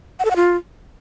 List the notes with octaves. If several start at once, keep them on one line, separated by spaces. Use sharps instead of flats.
F#5
A4
F#5
F4